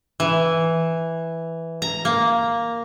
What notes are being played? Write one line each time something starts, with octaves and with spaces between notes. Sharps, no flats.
E3
A#5
A#3